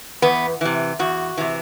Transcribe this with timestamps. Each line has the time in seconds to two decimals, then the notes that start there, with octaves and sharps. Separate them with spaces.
0.22 E2 B3
0.61 C3 E3
0.99 E2 F#4
1.37 C3 E3